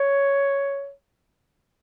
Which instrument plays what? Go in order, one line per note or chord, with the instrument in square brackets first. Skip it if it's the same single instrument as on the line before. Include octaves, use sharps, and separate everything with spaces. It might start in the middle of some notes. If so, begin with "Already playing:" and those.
Already playing: [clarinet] C#5